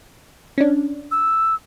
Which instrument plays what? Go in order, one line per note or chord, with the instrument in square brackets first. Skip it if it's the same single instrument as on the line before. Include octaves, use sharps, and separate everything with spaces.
[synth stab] C#4 D4
[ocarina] E6